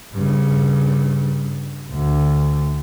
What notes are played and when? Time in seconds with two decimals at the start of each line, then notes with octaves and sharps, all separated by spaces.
0.12 G2 C#3
1.90 D2 D3